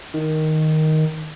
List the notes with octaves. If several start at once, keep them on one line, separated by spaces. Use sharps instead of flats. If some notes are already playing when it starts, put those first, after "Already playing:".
D#3